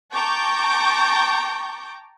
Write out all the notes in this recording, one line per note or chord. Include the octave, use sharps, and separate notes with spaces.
G5 A5 A#5 C#6 D6 G6